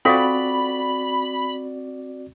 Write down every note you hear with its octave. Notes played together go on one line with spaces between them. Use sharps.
C4 F4 F#4 A4 D5 F5 B5